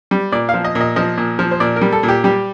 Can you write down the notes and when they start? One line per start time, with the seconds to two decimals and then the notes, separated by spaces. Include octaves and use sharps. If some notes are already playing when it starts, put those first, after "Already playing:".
0.11 G3
0.32 A#2 D5
0.49 F5
0.54 F3
0.64 D#5
0.75 A#2
0.81 D#5
0.96 F3 D#5
1.18 A#2
1.39 F3
1.51 C5
1.60 A#2 D5
1.76 A#4
1.81 G3
1.92 A4
2.03 A#2
2.08 G4
2.24 G3 G4